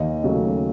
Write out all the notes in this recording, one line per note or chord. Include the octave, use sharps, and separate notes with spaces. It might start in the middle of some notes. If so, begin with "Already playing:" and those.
Already playing: D#2 D#5
C#3 F#3 A3